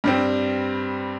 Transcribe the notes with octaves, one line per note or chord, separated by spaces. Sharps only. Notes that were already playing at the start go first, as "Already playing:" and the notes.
G2 G3 C4